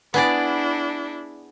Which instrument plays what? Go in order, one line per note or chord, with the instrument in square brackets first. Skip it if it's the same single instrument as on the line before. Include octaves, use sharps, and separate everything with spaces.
[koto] B3 G#4 D5 [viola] D4 E4